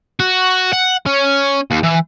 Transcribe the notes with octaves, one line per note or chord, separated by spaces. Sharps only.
F#4
F#5
C#4
D#2
E3